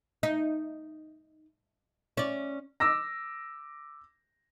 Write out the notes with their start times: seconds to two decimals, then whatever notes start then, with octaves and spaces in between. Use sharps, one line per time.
0.23 D#4
2.17 C#4 D5
2.80 D6 E6 A#6